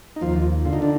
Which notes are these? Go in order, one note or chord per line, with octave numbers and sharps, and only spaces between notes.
D#4
D#2 F3 F4
D3 F4
D#4
D4